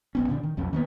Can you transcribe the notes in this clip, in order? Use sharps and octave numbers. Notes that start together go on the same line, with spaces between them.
A#1 B3 C#4
A#2 D3 D4
D#3
B1 F2 C#4
D#3 A#3 B3